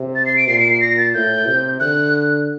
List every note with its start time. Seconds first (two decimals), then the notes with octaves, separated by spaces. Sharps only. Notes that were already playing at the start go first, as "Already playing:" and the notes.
Already playing: C3
0.15 A6
0.26 C7
0.37 D7
0.48 A#2 C7
0.59 D7
0.70 C7
0.81 A#6
0.98 A6
1.14 A2 G6
1.47 C3
1.80 D3 F#6